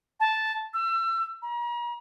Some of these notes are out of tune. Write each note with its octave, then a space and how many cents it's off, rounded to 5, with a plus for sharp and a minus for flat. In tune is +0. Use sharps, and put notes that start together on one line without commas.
A5 -5
E6 +30
A#5 +40